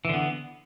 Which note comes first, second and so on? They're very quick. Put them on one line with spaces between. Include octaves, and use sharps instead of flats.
E3 D3 B3